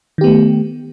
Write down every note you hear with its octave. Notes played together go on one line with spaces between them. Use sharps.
D#3 A3 B3 G4